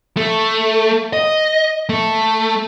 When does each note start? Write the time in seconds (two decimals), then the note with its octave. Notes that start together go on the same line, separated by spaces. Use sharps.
0.17 A3
1.13 D#5
1.89 A3